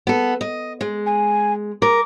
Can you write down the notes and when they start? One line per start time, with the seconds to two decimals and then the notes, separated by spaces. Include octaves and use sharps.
0.07 B3 A4
0.41 D#5
0.81 G#3
1.06 G#5
1.82 A#4 D6